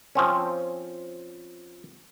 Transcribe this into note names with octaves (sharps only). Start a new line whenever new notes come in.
F3 C4 C#4